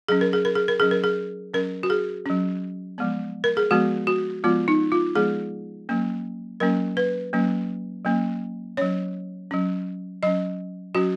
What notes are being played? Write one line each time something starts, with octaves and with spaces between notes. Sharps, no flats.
F#3 C#4 G#4
A#4
G#4
A#4
G#4
A#4
F#3 C#4 G#4
A#4
G#4
F#3 C#4 A#4
F#4
G#4
F#3 C#4
F3 G#3 B3
A#4
G#4
F3 G#3 B3 F#4
F#4
F3 G#3 B3 F4
D#4
F4
F3 G#3 B3 G#4
F#3 A#3 C#4
F#3 A#3 C#4 A#4
B4
F#3 A#3 C#4
F#3 A#3 C#4
F#3 C#4 C#5
F#3 C#4
F#3 C#4 D#5
F#3 C#4 F#4